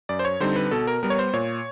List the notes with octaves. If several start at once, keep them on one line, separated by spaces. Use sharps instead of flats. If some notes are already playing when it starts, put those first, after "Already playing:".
F#2 D5
C5
C#5
D3 G3 C4 D#4 C5
B4
B2 A4
A#4
G3 B3 A#4
C#5
C5
A#2 C#5